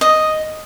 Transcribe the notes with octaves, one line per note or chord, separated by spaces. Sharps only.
D#5